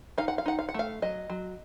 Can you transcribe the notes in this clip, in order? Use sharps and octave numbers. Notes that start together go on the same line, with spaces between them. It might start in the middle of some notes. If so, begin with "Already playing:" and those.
D#4 F5
F#5
F5
D#4 F#5
F5
F#5
A3 F5
F#3 D#5
F#3